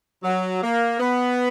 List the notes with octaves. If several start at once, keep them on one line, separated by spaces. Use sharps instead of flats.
F#3
A#3
B3